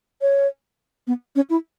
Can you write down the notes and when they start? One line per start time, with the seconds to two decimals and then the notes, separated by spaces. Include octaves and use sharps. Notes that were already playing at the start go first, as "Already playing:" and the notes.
0.21 C#5
1.07 B3
1.36 C#4
1.50 E4